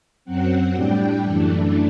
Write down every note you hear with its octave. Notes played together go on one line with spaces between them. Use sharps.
F#2 F#3 C4 F#5
A2 G3 D4 G5
F#2 E3 A3 D4